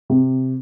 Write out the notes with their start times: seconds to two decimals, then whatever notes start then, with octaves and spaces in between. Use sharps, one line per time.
0.10 C3